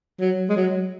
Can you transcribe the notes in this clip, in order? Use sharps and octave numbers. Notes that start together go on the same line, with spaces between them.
F#3
G#3
F#3